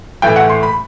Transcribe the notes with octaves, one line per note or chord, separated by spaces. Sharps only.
A2 E3 A3 G5
F#5
C6
B5